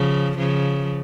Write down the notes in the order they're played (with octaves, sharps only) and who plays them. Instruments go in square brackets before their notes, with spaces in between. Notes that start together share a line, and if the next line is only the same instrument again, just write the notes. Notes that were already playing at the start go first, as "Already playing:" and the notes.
Already playing: [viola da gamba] C#3 F3
C#3 F3